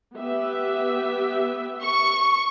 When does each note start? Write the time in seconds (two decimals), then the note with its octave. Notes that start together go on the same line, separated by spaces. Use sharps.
0.17 B3 G4 E5
1.83 C#6